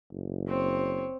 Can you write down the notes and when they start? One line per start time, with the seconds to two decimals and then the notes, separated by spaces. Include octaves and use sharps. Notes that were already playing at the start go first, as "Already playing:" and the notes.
0.12 F#1
0.48 C4 C#5